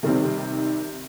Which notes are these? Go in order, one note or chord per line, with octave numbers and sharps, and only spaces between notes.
C3 D#3 G3 C4